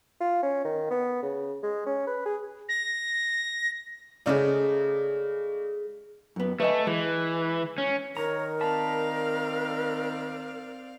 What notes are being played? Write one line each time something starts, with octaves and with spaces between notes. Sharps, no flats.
F4
C#4
D#3
B3
C#3
G#3
C#4
B4
G#4
A#6
C#3 G#3 A3 D#4 D5
F#2 B3
A3 B4 D#5 G#5
E3 G#3
C#4
D#3 A#4 C#5 A#5
C4 D5 F5 A5 B5